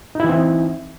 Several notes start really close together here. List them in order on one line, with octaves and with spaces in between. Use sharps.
D#4 E4 E3 C4